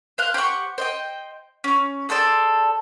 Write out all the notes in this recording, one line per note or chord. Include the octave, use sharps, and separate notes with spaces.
C5 F5 F#6
G4 C5 F#5 C#6
C5 D#5 G5
C#4
G#4 A4 C5 D5